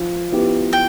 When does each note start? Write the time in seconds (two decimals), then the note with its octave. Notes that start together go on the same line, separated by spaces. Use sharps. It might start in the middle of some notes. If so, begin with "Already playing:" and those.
Already playing: F3
0.32 B3 E4 G4
0.73 G5